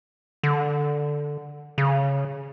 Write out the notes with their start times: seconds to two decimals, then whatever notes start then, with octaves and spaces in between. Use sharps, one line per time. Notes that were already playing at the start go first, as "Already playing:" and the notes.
0.43 D3
1.78 C#3